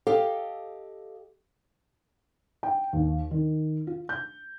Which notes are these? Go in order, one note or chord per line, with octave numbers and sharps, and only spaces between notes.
G4 A4 D#5 F5
G5
D#2
D#3
F4
G6